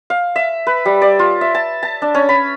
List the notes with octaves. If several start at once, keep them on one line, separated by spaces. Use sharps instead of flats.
F5
E5
B4
G3
D5
F4
E5
A5
A5
D4
C#4
B5